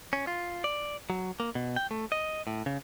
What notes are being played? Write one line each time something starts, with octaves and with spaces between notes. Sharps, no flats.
C#4
F4
D5
F#3
A#3
B2
G5
A3
D#5
A2
C#3